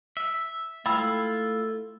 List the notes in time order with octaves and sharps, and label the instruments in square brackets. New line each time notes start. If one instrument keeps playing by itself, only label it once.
[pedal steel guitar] E5
[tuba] A3 [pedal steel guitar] E4 F4 [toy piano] G5 B5 E6